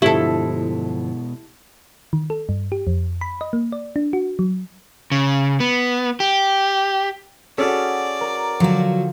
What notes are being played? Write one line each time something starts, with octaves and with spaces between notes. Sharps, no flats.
G2 B2 D3 F3 G#3 E4 G4 A4
D#3
A4
G2
G4
F2
B5
D#5
A#3
D5
D4
F#4
F#3
C#3
B3
G4
C#4 F#4 G#4 A4 D5 F6 B6
A#4 A#5
D3 F3 F#3 F#4